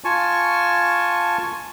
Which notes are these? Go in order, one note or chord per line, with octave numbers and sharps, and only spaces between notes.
F4 G#5 A5 C#6